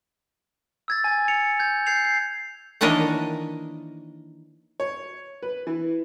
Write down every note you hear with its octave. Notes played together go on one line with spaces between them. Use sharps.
E6 G#6 A6
G#5 G#6
C#7 F7
G6 G#6
G6 G#6 C7 F7
C7
D#3 E3 A#3 D4 C#5 D#5
C#5
B4
E3